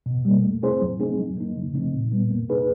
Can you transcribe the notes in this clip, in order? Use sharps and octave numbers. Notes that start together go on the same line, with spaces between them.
B2
G3 A#3
A3
C4 E4 G#4 C5
F#3
A3 C4 D#4 G#4
F#3
A#3 D#4
C#3
F3 A3 C4 D#4
A#2
G3 B3
A#3
D#4 G#4 B4